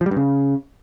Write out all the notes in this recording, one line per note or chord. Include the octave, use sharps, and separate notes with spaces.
F3
G3
G2
C#3